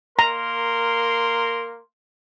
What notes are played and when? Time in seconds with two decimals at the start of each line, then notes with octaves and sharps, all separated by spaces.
0.19 A#3 A#4 A#5 C6